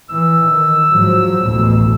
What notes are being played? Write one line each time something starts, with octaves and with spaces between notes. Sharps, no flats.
E3 E6
D#3
G#2 F3 F#3
A1 D2 B2